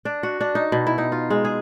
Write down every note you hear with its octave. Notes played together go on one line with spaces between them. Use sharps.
D4
F#4
D4
D#4
B2
E4
D#4
F4
G#3
G#4